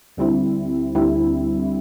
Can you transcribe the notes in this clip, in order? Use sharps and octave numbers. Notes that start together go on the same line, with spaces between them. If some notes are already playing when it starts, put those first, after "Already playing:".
D2 D3 G3 C4 E4
D2 D3 G3 C4 E4